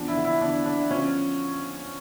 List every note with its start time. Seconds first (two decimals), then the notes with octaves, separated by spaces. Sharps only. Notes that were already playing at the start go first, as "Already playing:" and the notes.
Already playing: E2 F3 D4
0.08 E4
0.17 D3
0.25 E4
0.41 E2 D4
0.66 D3 D4
0.91 F3 C#4